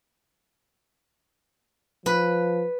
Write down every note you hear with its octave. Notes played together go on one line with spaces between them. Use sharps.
F3 B4